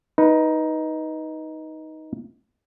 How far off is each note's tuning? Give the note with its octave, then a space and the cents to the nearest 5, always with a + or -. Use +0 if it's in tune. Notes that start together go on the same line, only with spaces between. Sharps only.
D#4 +10 B4 -15